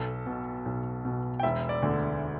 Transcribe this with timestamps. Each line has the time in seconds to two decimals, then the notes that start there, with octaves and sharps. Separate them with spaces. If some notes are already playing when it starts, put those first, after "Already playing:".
Already playing: B1 A4 A5
0.26 B2
0.66 B1
1.05 B2
1.40 G5
1.43 E1 E5
1.69 D5
1.82 D2 D3